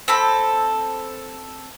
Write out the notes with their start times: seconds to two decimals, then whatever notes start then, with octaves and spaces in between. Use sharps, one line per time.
0.08 C4 A4 B5